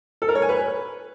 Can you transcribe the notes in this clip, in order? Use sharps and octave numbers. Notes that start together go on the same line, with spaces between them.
A4
A#4
C#5
G#5
B4